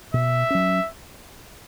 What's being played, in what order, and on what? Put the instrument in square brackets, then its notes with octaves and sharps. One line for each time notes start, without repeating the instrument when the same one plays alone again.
[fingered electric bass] B2 [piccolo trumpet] E5
[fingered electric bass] F#3 C#4